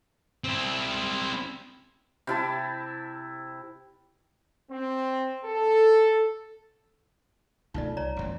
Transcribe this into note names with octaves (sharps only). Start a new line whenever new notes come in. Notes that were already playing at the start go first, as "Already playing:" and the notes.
C4 E4
C3 E4 A5
C4
A4
B1 C#3 A3 D#4 F4 D5
C2 C#5 D5 A#5
A1 E2 E3